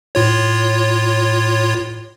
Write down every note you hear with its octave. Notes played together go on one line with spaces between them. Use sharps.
A2 F4 C#5